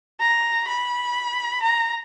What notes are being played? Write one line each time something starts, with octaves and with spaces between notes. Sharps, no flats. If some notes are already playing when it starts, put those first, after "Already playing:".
A#5
B5
A#5